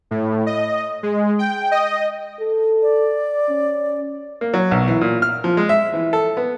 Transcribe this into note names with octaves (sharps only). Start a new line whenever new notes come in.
A2
D#5
G#3
G5
D#5
A4
D5
C#4
A#3
F#3
B1
E3
A#2
F6
F3
G#3
E5
E3
A4
B3